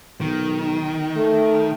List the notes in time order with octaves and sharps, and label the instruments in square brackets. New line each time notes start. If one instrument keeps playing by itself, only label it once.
[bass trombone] B1 [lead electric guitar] D#3
[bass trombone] A3